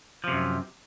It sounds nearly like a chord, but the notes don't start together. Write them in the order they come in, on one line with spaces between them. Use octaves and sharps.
F3 C3 F#2